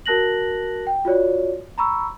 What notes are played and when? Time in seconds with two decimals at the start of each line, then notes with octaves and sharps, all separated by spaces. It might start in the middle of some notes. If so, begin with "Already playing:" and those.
0.06 F#4 A#4 A5 F#6 A#6 F#7
0.87 G5
1.05 F4 F#4 C#5 D5
1.78 A#5 B5 C#6 E6